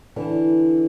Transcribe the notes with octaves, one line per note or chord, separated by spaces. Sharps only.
D3 E3